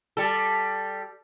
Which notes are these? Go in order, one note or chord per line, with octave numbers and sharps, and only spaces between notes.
G3 A4